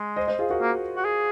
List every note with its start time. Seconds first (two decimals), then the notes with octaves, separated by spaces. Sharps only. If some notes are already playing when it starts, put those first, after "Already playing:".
Already playing: G#3
0.16 C5 D#5
0.27 C5 D#5
0.39 F4 G#4
0.50 F#4 A#4
0.61 A#3
0.97 F#4
1.05 G#4